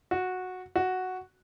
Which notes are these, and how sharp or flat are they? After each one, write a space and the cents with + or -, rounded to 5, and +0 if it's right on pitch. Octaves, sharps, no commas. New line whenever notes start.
F#4 -10
F#4 +0